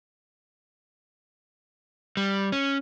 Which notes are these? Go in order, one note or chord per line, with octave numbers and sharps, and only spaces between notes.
G3
C#4